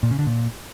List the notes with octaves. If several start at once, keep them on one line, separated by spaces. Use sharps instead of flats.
A#2
C#3
D3
A#2